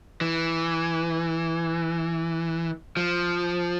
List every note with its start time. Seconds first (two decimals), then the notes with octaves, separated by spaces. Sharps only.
0.21 E3
2.97 F3